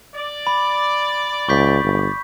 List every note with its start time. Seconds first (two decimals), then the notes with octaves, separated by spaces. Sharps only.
0.16 D5
0.47 B5
1.49 C#2 C#6 G6 B6
1.84 G1